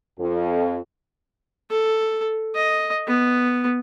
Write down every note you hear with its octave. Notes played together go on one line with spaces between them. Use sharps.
F2
A4
D#5
B3